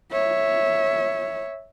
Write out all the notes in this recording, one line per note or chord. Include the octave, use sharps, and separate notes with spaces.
C#5 E5